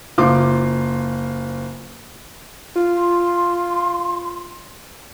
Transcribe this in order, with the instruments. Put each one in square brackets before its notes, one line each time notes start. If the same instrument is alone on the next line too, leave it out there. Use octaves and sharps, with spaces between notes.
[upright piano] F#1 F4 C6 D6
[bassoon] F4
[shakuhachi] C6